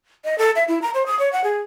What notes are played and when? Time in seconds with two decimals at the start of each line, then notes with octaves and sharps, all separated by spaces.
0.24 D#5
0.38 A4
0.56 E5
0.68 E4
0.82 A#5
0.94 C5
1.06 D#6
1.19 C#5
1.33 F#5
1.44 G#4